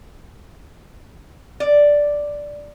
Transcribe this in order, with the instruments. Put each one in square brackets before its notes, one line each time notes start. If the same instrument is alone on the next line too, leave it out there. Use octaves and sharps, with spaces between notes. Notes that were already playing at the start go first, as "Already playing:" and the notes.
[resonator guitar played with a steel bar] D5